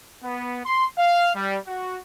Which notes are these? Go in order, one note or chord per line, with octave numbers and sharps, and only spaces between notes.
B3
C6
F5
G3
F#4